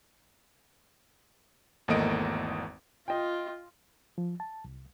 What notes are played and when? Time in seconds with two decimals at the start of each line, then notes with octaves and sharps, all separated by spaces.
1.88 G#1 E2 A3 A#3 D#5 D7
3.08 F4 D#5 G5
4.18 F3
4.40 A5
4.65 C2